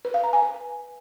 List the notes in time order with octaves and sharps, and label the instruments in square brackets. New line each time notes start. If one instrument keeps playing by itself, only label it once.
[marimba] B4
F5
A#5
G#5
B4